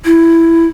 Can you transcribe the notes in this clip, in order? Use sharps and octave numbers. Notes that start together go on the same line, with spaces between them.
E4